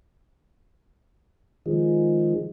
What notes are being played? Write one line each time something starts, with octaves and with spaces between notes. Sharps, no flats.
D#3 F3 G#3